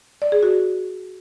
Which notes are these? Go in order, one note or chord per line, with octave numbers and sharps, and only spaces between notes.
D5
G#4
F#4